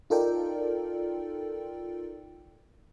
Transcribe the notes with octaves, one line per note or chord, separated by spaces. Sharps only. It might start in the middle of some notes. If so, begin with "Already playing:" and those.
D#4 F4 A4 A#4 D5 G5